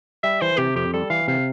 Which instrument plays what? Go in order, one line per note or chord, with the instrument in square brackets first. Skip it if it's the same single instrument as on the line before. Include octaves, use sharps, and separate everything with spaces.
[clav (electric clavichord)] G3 [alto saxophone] E5
[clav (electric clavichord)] E3 [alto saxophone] C5
[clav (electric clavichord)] C3 [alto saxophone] G4
[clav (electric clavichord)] F2 [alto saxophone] G4
[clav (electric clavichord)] G3 [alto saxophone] A4
[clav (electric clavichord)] E3 [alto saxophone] F5
[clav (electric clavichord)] C3 [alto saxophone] F5